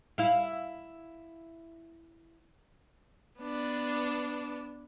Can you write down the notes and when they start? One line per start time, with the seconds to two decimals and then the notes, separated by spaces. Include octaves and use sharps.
0.18 E4 F5
3.40 B3 D4